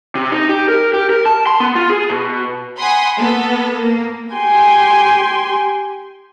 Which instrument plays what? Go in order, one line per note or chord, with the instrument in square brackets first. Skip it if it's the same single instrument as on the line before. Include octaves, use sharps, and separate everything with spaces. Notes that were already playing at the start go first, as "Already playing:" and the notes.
[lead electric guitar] C3
D#4
G4
A#4
G4
A#4
A5
C6
B3
F4
G#4
B2
[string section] F#5 G#5 B5 C6 D#6
A#3 B3 A4
A#3
[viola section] G4 G5 G#5 C6